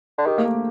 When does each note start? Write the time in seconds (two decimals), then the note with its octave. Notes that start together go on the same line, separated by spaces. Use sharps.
0.18 D3
0.26 D#3 G4
0.38 A#3
0.45 A3